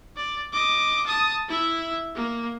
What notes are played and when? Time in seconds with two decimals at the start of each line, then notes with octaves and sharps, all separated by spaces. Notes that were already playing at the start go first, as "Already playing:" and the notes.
0.17 D5
0.53 D#5 D6
1.07 A5 D#6
1.49 E4 E5
2.15 A#3